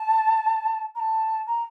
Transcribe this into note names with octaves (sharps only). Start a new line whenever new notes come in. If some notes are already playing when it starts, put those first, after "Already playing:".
Already playing: A5
A#5
A5
A#5